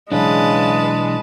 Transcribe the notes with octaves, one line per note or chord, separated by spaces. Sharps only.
B1 C#3 E3 G#3 D4 B4 A5